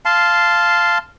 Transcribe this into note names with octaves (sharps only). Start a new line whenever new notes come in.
F5 A5 C6